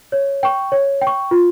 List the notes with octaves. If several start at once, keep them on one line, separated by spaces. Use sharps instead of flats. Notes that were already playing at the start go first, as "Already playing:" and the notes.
C#5
G5 C#6
C#5
G5
C#6
F4